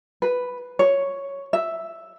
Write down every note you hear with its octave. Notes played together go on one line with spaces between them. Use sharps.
B4
C#5
E5